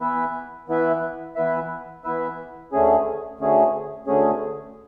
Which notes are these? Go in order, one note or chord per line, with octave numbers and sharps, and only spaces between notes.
E3 B3 E4 B4 E5
E3 B3 E4 B4 E5
E3 B3 E4 B4 E5
E3 B3 E4 B4 E5
D2 D3 A3 C#4 G#4
D2 D3 A3 C#4 G#4
D2 D3 A3 C#4 G#4